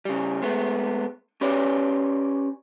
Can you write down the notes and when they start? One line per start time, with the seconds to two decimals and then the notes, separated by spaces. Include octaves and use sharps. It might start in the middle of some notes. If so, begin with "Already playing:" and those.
0.05 C#3 G3
0.42 G#3 A3 B3
1.41 C#4 G4 B4 C#5 D5